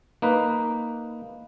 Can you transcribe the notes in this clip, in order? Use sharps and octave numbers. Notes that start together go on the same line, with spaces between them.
A#3 D#4 B4